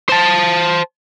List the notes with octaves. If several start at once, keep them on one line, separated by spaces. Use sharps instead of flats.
C5 A5